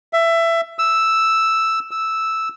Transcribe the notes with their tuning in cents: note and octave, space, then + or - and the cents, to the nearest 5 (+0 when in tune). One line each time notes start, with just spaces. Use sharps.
E5 +20
E6 +0
E6 -5